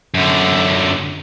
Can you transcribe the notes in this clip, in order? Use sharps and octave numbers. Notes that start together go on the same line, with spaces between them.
F#2 D3